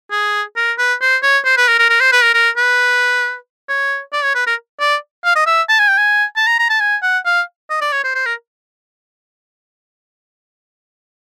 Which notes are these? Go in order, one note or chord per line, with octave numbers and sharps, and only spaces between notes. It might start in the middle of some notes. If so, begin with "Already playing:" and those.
G#4
A#4
B4
C5
C#5
C5
B4
A#4
A#4
A#4
C5
B4
A#4
A#4
B4
C#5
D5
C#5
B4
A#4
D5
F5
D#5
E5
A5
G#5
G5
G#5
A5
A#5
A#5
A5
G#5
F#5
F5
D#5
D5
C#5
C5
C5
A#4